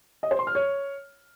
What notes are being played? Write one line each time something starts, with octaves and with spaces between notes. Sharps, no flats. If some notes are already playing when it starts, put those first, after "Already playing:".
D#5
C5
C6
F6
C#5